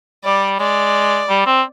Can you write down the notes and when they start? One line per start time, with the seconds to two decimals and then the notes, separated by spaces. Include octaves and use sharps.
0.24 G3 D5
0.59 G#3 D5
1.29 G3
1.46 C4